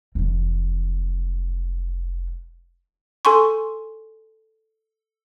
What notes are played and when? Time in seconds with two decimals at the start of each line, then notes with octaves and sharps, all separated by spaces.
0.15 F1 E3
3.25 A4 G#5 C6 C#6